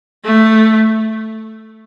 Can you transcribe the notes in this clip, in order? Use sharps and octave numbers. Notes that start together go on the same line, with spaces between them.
A3